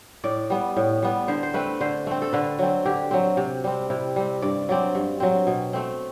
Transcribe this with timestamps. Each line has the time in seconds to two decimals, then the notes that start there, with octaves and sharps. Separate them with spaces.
0.24 A2 D5
0.50 G3 B3
0.77 A2
1.02 G3 B3
1.28 D3 C5
1.43 C5
1.54 A3 C4 B4
1.81 D3 C5
2.07 A3 C4
2.22 A4
2.33 D3 B4
2.59 F#3 C4
2.85 D3 G4
3.11 F#3 C4
3.37 C3
3.64 G3 C4
3.90 C3 E4
4.16 G3 C4
4.42 G2 D5
4.69 F#3 C4 D5
4.95 G2
5.20 F#3 C4
5.47 B2
5.73 A3 C4